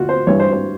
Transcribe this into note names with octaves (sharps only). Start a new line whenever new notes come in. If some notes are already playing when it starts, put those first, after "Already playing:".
Already playing: D2 F4 F#4
C5
G2 E3 G3 C#5
C5
C5